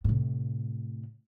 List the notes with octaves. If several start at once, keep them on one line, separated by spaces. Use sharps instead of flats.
A2 C3